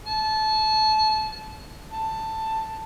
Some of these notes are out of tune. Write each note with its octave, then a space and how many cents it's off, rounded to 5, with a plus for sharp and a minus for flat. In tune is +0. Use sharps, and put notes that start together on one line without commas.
A5 -25
A5 +10